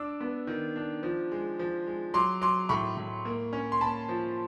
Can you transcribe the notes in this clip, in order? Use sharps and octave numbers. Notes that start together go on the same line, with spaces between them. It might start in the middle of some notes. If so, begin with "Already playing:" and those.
Already playing: D4 D6 E6
B3
D#3
D4
F3
G#3
F3
G#3
F#3 C6 D6
F#3 C6 D6
A2 B5 C#6
A2
A#3
C#4
C6
A#3 A5 B5
F3